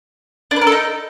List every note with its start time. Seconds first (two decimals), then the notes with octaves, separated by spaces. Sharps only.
0.51 D4
0.56 B4
0.62 A#4
0.67 A4
0.72 D#4